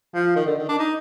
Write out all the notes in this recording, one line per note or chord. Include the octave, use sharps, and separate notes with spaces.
F3
D#3
D3
D#3
D4
D#4